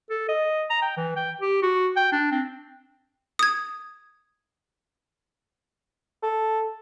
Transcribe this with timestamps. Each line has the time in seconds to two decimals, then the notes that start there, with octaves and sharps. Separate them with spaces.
0.10 A4
0.29 D#5
0.70 A#5
0.82 G5
0.97 E3
1.16 G5
1.41 G4
1.62 F#4
1.96 G5
2.12 D4
2.32 C4
3.39 D#6 G#6
6.22 A4